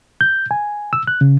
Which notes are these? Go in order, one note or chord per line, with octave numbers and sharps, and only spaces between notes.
G6
G#5
E6
F#6
C#3